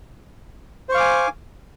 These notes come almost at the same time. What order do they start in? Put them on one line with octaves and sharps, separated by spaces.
C5 C#6 F5 D6 G#5